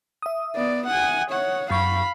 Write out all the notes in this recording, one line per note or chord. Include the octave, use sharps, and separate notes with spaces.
E5 D#6
B3 D5
F#5 G#5
C#5 F#5
F#2 F5 B5 C#6